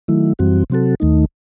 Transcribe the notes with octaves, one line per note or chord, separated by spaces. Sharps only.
D#3 F#3 A3 E4
F#2 E3 G3 C4 F#4
C3 F#3 C4 F#4 A4
D#2 D#3 A3 D#4